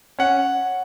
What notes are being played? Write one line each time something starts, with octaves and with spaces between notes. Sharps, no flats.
C#4 F#5